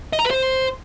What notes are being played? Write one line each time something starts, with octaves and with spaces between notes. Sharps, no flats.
D#5
A#5
B4
C5